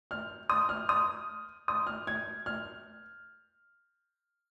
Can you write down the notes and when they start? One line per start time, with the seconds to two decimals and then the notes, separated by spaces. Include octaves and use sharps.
0.11 F6
0.50 D#6
0.69 F6
0.89 D#6
1.68 D#6
1.87 F6
2.07 G#6
2.46 F6